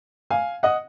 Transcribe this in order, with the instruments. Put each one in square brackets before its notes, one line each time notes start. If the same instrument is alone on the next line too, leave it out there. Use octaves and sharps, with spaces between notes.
[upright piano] F5 G#5
D#5 F#5